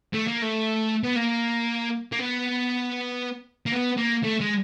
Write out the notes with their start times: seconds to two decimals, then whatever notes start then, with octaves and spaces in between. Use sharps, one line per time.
0.13 A3
0.27 A#3
0.42 A3
1.04 B3
1.16 A#3
2.12 A#3
2.19 B3
3.66 A#3
3.72 B3
3.97 A#3
4.23 A3
4.40 G#3